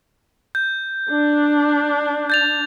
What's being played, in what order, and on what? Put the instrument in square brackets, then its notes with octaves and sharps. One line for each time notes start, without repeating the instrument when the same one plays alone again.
[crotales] G6
[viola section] D4
[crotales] G6 A6 F7